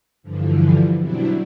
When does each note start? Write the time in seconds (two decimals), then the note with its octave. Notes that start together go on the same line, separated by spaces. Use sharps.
0.23 G2 D3 E3 F3
0.99 B2 F#3 G3 C4 D4 E4